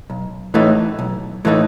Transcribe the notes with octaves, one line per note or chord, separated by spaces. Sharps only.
B1
A2 E3 A3 D#4
B1
A2 E3 A3 D#4